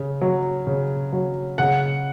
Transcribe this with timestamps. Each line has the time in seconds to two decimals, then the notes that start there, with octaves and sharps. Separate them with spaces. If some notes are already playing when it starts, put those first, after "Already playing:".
Already playing: C#3
0.21 F#3
0.67 C#3
1.13 F#3
1.58 C#3 F#5